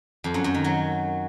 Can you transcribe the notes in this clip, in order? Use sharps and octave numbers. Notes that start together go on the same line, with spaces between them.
F2
F#2
F#2
D#3
F#3